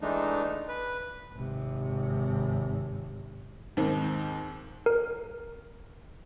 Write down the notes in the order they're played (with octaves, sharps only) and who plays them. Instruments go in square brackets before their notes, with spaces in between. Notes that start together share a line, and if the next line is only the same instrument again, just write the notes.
[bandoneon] E3 G#3 A3 D4 D#4
B4
[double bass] G#1 C3
[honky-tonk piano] D#2 G#2 D#3 C4
[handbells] A#4